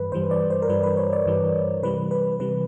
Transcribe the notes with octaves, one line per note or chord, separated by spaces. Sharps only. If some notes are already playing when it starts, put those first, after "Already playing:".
Already playing: G2 E3 G3 B4
G2 E3 G3 C5
D5
C5
A#4
G2 E3 G3 B4
B4
C#5
D5
G2 E3 G3
C3 E3 G3 B4
B4
C3 E3 G3 B4